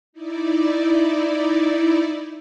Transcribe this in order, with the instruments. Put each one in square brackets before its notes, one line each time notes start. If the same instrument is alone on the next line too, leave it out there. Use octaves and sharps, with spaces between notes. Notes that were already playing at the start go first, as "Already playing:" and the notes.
[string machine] D#4 E4 D5